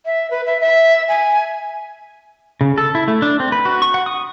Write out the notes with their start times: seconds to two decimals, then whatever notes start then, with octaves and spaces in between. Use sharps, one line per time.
0.06 E5
0.31 B4
0.46 E5
0.61 E5
1.08 G#5
2.61 C#3
2.78 A4
2.95 E4
3.08 A3
3.22 D4
3.40 C4
3.52 B4
3.65 F#4
3.82 C#6
3.94 F#5
4.06 D#6